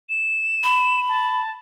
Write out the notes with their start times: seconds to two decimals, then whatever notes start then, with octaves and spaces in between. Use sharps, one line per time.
0.09 E7
0.64 B5
1.09 A5